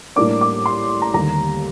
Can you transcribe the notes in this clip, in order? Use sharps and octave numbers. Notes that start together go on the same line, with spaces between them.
A2 G3 A#3 D4 D6
D6
C6
A#5
D#2 D3 G3 A#5